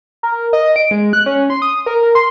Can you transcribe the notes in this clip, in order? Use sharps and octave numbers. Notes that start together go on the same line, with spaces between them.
A#4
D#5
D7
G#3
F#6
C#4
C6
D#6
A#4
A#4
C6